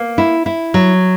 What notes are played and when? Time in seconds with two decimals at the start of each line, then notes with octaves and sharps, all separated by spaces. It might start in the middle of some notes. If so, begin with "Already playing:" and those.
Already playing: A#3
0.18 E4
0.46 E4
0.74 F#3